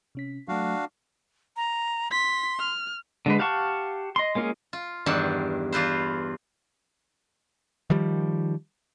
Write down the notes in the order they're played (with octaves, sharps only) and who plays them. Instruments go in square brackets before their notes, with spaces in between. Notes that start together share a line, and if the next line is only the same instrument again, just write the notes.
[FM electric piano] C3 C#4 B6
[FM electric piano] F#3 A3 [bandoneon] D4 F#4 F5
[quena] A#5
[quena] C6 [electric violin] B6
[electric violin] F6
[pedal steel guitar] D3 G#3 B4
G4 F5 F#5 A5 C#6
D#5 C6
G#3 A#3 C#4 F4 G#4
[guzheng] F4
E2 G2 D#3 F5 F#5 A5
E2 F4 B4 C5
[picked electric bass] D#3 F3 G3